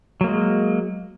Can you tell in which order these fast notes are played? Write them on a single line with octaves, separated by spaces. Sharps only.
F#3 A#3 G#3